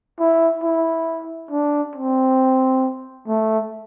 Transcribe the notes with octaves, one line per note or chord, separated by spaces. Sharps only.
E4
E4
D4
C4
A3